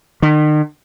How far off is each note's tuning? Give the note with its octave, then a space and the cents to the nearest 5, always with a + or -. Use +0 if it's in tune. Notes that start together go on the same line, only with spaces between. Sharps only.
D#3 -40